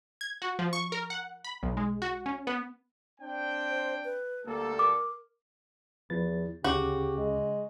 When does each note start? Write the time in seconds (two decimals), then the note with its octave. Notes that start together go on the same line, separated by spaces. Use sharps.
0.21 G#6
0.42 F#4
0.59 F3
0.73 C#6
0.92 A#4
1.10 F#5
1.44 B5
1.63 B1
1.77 G#3
2.02 F#4
2.26 C#4
2.47 B3
3.21 C4 D4 G5
3.70 C5
4.05 B4
4.46 D2 G3 A#3 A4
4.79 A#4 D6
6.10 E2 F3 B4 A6
6.64 D2 C#3 C#4 F#4 G4 D6
7.17 G#3